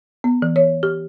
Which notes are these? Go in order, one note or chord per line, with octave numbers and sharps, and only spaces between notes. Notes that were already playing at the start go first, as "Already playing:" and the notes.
B3
E3
C#5
G4